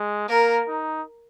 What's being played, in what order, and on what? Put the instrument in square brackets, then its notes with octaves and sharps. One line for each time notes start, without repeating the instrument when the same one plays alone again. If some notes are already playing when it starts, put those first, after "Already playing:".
Already playing: [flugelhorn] G#3
[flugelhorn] A#3 [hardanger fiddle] A#4
[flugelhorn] D#4